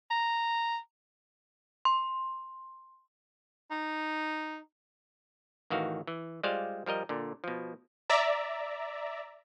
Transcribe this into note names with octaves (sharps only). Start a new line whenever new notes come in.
A#5
C6
D#4
A1 D#3 E3 F#4 F5
E3
G3 G#3 F4 C5 D5 F5
F3 G3 A#4 D#5
A#2 D3
B2 F3
D5 E5 A#5